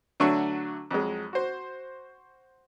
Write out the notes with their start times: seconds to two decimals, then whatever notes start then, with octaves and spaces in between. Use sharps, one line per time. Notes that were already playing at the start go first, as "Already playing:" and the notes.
0.20 D3 F#3 A3 D4 F#4 C#6
0.91 F2 F#3 G#3
1.33 F#4 C5